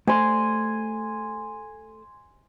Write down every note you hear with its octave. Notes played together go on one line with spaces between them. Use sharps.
A3 C5 D5 G#5 C6